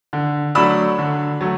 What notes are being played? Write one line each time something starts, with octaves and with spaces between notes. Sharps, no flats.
D3
F#3 A3 D4 B5 E6
D3
F#3 A3